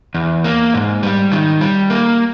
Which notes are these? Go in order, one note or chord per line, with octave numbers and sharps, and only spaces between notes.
E2
A#3
G#2
G3
D#3
G3
A#3